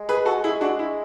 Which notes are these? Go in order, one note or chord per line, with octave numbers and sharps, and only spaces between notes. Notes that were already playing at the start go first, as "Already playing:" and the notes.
Already playing: G#3
G#4 B4
F#4 A4
E4 G#4
D4 F#4
E4